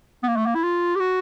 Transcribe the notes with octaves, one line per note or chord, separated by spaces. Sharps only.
B3
A#3
A3
A#3
E4
F4
G4
F#4